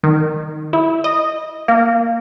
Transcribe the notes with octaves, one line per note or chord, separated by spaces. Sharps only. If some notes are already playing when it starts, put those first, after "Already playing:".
D#3
E4
D#5
A#3